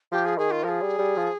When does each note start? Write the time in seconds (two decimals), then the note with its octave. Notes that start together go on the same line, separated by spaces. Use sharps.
0.12 F3 G4
0.25 G#4
0.38 D#3 G#4
0.51 F4
0.64 F3 G#4 A#4
0.82 G3
0.99 G3
1.17 F3